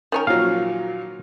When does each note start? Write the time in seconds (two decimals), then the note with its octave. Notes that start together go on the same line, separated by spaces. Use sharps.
0.12 D#3 C#4 A#4
0.27 A#2 F3 F#3 F5